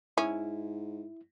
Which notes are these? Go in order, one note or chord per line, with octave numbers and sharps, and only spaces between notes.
G#2 C#4 E4